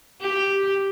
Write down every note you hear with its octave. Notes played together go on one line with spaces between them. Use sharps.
G4